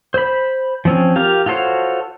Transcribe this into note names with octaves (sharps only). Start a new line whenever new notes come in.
C5 B5
F3 C4 C#4
F4 G4 A#4 F5
F4 F#4 A4 C5 C#5